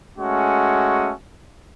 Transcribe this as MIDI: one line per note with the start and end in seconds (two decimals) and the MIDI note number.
0.18 1.13 56
0.18 1.13 57
0.18 1.13 61
0.18 1.13 66